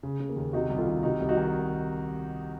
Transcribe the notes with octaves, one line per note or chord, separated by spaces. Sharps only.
C#3
C#3
A#3
D#2
C3 D#4 F#4
C2
F4 A4
D#3
C3 D#4 F#4
C2
D#4 F#4
D#3